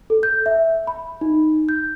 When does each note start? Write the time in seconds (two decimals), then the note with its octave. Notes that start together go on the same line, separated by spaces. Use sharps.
0.10 A4
0.23 G6
0.46 E5
0.87 B5
1.21 D#4
1.69 G6